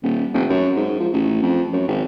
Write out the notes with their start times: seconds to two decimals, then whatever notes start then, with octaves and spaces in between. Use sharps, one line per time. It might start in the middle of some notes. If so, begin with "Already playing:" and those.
0.03 D#1
0.34 F1
0.50 F#2
0.76 G#2
1.00 F3
1.13 A1
1.42 F2
1.73 F#2
1.88 G#1